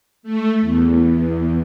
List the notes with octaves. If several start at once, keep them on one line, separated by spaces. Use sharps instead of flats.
A3
E2